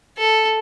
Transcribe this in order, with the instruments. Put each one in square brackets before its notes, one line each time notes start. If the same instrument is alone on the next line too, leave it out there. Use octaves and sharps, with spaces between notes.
[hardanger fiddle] A4